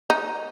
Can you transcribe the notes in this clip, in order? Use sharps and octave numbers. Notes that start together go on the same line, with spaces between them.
D#4